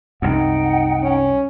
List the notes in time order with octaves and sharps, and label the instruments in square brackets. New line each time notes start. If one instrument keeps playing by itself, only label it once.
[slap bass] C2 F#2 [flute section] D#4 F#5 G5
[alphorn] C#4